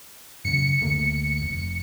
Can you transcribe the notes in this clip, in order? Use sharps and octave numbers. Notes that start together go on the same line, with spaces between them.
F#2 C#3 C#7
D2 A3 A#3
F1